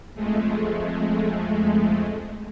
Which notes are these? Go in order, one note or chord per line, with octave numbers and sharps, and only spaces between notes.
F2 G#3 A3